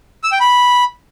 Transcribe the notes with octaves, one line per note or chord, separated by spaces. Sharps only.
E6
G5
B5